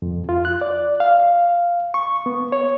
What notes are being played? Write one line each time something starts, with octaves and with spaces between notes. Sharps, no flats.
F2
F4
F#6
D5
F5
C#6
B3
C#5